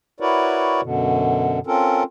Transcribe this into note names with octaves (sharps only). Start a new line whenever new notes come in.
E4 F#4 A#4 B4 C#5 D5
F#2 B2 D3
C4 C#4 F4 A4 A#4